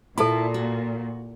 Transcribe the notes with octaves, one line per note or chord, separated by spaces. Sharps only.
A#2 E4 A4 A5 C6
F#4